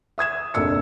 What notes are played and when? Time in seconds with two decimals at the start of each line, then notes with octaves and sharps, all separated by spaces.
0.18 E5 D#6 G#6 E7
0.54 F1 A#1 A#3 E6 C#7